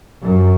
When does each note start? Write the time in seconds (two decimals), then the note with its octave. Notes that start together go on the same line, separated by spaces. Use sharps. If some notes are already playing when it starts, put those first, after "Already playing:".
0.22 F#2